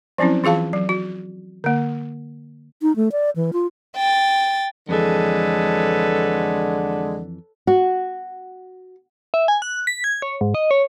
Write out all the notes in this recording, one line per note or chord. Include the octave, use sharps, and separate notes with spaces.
F3 F#3 C4 C#4 E4
E3 F4 G#4 F5 A5
F#3
F#4
D3 A#3
D#4
A3
D5
E3
F4
G5 A6
F2 D3 E3 G#3 A4 B4 C#5
F#4
E5
G#5
F#6
B6
G#6
C#5
G#2
D#5
C#5